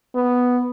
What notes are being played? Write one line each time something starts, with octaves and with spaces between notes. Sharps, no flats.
B3